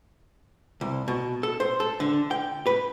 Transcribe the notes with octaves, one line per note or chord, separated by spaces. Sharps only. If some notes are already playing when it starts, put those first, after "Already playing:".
C2
B2
A4
C5
A4
D3
G5
B4